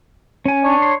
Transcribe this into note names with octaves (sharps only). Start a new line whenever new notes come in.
C#4 G#5
D4 C#5
C6